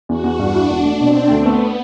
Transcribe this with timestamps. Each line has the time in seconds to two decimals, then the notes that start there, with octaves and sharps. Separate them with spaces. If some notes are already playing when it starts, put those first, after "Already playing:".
0.09 E2 F#4
0.24 E2
0.39 G2 D4
0.55 E4
0.70 E1
0.85 A3
1.00 B2 C4
1.16 D4
1.30 D2 B3
1.46 A3